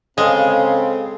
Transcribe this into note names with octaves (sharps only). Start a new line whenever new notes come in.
C#3 G#3 C4 A4 F5 G#5